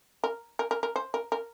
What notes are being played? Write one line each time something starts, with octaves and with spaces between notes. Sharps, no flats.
A#4
A#4
A#4
A#4
C5
A#4
A#4